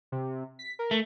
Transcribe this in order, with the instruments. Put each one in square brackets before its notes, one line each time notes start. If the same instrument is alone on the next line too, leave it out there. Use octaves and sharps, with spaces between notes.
[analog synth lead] C3
B6
A#4
[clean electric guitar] A3